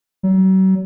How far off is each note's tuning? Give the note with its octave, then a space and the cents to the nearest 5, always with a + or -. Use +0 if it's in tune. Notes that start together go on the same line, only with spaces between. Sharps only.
F#3 +40